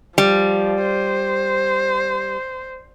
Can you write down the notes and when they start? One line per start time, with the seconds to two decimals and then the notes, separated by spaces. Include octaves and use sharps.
0.18 F3 G3
0.83 C5